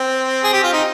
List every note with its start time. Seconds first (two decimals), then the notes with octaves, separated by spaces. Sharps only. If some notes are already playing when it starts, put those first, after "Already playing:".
Already playing: C4
0.43 G#4
0.53 G4
0.63 F4
0.73 D#4